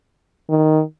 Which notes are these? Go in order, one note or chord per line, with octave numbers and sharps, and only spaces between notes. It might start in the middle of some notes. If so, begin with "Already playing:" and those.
D#3